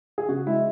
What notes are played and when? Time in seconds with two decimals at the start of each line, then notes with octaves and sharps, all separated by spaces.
0.18 G#4
0.29 C#3 F#4
0.47 G#3 E4